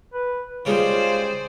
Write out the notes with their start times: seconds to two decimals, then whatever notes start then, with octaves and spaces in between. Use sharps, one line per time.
0.14 B4
0.65 C#3 G3 G#3 F4 G#4 C5 D5